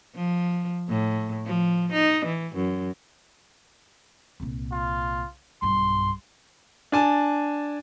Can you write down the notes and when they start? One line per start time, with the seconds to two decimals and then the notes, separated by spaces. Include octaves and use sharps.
0.15 F3
0.89 A2
1.46 F3
1.92 D#4
2.26 E3
2.55 F#2
4.40 C2 A#2
4.72 F4
5.62 B1 G2 C6
6.92 D4 G#5 A5